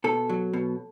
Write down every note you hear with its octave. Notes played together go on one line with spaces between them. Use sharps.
B2 A4
F#3
B2